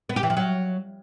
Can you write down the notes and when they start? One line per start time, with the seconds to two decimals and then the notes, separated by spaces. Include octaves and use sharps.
0.09 B3
0.16 G4
0.23 E3
0.30 F3
0.37 F#3